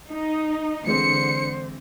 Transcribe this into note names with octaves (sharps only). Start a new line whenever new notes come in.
D#4
D3 E3 G#3 C4 C5 C#7